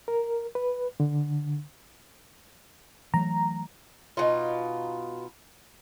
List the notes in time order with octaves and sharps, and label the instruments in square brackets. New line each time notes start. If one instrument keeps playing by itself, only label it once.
[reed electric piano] A#4
B4
D3
[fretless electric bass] E3 F#3 A3 [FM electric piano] A#5
[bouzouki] B2 D#4 F4